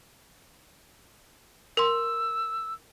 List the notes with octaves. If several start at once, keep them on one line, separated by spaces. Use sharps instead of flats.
A#4 C6 E6